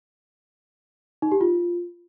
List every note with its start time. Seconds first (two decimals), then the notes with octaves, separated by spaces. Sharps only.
1.22 D#4
1.32 G4
1.41 F4